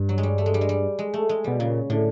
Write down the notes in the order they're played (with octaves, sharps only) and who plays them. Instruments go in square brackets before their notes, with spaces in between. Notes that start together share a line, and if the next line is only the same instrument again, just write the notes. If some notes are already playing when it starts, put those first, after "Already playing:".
Already playing: [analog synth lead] G2
[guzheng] F#3
G#3
G3
A3
G#3
G3
G#3
G3
G#3
A3
G#3
[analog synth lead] B2 [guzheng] G3
[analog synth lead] A#2 [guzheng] C#3
[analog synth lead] A2 [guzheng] D3